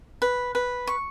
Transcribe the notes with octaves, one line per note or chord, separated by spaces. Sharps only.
B4
B4
C#6